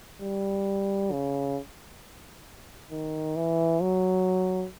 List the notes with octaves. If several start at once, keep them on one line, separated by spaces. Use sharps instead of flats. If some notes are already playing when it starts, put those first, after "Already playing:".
G3
C#3
D#3
E3
F#3